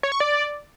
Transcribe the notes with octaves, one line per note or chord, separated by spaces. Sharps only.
C#5
C#6
D5